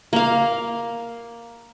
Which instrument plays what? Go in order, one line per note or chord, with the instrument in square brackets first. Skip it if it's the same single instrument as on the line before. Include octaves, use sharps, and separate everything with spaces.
[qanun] A#3 F5